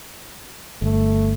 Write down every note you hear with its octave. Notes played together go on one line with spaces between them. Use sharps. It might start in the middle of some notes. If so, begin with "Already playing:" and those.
G1 A3